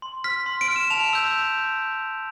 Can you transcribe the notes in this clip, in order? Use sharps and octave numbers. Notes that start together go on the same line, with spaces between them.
C6
F6 B6
C6
D7
F6
E7
A5 F7
E6 G6